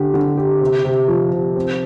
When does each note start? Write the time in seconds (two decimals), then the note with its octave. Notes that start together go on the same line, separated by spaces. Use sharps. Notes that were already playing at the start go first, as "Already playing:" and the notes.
Already playing: D3 G4
0.14 D3
0.37 G4
0.61 C3
0.85 C3
1.08 F3
1.33 C3
1.56 C4